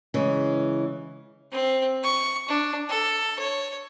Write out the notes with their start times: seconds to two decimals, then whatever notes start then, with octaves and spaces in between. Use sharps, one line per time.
0.14 C#3 E3 G#3
1.52 C4
2.03 C#6
2.48 D4
2.89 A4
3.39 C#5